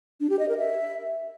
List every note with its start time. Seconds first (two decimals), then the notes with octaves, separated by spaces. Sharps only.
0.20 D4
0.30 G4
0.39 D#5
0.49 A#4
0.58 E5